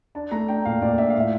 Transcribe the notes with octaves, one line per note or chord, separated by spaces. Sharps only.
D4 A5
A3 A#5
D4 G5
A#2 F5
A#2 D5
D4 E5
F5
A2
E5